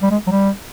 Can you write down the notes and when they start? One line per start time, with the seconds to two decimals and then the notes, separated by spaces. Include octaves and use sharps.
0.02 G3
0.11 G#3
0.27 F#3
0.31 G3